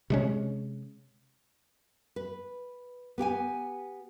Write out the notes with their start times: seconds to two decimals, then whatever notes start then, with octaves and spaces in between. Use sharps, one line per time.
0.10 C3 G#3 C#4
2.16 B4
3.18 B3 G4 G5 G#5